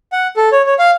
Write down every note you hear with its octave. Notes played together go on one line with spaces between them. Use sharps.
F#5
A4
C#5
C#5
F5